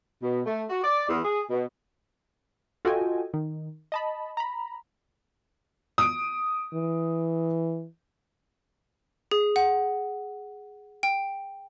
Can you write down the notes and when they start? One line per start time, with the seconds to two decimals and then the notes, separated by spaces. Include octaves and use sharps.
0.22 B2
0.46 A3
0.69 F#4
0.83 D5
1.08 E2
1.24 G#4
1.50 B2
2.85 F4 F#4 A4 D#5 G5 G#5
3.34 D#3
3.92 D#5 A5 B5
4.37 A#5 B5
5.98 D#6 D7
6.74 E3
9.31 G#4
9.56 F#5
11.03 G5